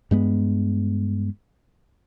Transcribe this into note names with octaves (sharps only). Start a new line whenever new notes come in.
G2 G#3 B3